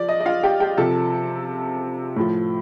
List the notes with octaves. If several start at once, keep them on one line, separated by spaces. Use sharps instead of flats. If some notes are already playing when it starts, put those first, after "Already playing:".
Already playing: F3 D5
D#5
D#5
F4 F5
G4 G5
G4 G5
C3 F3 A4 A5
A2 F3